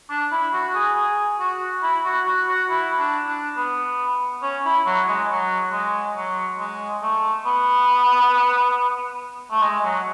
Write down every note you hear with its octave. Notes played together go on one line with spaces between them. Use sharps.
D4
E4
F#4
G#4
G#4
F#4
E4
F#4
F#4
F#4
E4
D4
D4
B3
C#4
E4
F#3
G#3
F#3
G#3
F#3
G#3
A3
B3
A3
G#3
F#3